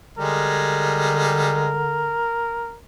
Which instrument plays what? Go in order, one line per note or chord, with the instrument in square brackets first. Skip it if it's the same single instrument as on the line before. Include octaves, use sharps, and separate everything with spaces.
[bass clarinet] D3 [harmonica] G3 G#3 [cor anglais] A#4